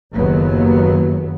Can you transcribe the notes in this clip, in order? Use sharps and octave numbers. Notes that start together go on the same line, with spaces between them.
F#1 D#2 F#3 B3